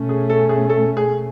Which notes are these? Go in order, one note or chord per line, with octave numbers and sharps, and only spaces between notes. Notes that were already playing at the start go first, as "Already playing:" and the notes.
Already playing: B2 A3 C#4
G#4
A4
G#4
A4
G#4